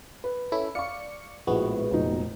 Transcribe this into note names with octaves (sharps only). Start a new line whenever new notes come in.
B4
C#4 E4 A4
D5 F5 C#6 C#7
A#1 A2 G#3 B3 F#4
F1 A#2 D#4